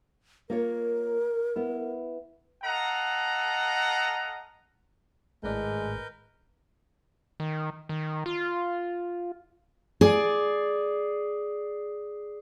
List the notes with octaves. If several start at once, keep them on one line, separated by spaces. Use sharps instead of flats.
A#3 F4 A#4 C#5
B3 E4
A4 D#5 F5 F#5 A#5
G#1 A2 G#3 D4 A#4 B4 G6
D#3
D#3
F4
G#4 D5